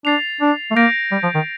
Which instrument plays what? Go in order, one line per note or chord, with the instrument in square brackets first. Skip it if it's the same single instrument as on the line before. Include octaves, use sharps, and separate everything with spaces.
[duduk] D4 [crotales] A6 C7 F7
[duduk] D4
A3
[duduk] A#3 [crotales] G6 A#6 D7
[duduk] G3
F3
D#3